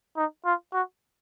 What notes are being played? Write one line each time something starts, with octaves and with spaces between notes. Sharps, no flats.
D#4
F4
F#4